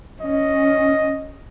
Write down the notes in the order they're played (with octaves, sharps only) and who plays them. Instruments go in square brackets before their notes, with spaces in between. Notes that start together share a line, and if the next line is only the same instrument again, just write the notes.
[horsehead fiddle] C#4 [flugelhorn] D#5